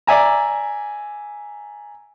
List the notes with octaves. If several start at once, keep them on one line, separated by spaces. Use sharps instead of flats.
D5 E5 G#5 A#5